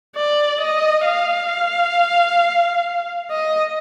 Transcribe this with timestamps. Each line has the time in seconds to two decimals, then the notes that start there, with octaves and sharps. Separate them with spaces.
0.16 D5
0.61 D#5
1.05 F5
3.31 D#5